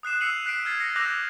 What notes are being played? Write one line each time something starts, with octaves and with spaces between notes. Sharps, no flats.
D#6 F#6 C7 E7
E6 C7 C#7 D#7 F7 F#7
F#6 B6 C7 D7 D#7
F6 G#6 A6 C7
A#6 C7 C#7
D6 E6 F#6 G6 A#6 F7